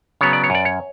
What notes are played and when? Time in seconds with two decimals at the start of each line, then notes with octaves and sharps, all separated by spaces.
0.21 C#3 F#3 B3 C#5
0.33 D5
0.44 C#5
0.50 F#2 D5
0.65 C#5